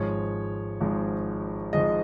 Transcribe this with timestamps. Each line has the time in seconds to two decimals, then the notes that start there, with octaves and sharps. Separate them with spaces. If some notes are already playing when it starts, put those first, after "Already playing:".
Already playing: G#1 G#2 F3 G#3 C#5
0.81 G#1 G#2 F3 G#3
1.73 G#1 G#2 F3 G#3 D#5